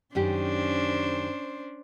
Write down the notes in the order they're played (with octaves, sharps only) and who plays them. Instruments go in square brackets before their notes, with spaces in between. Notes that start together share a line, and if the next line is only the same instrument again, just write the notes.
[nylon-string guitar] F#2 D#3 G4 [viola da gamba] C#4 D4 C5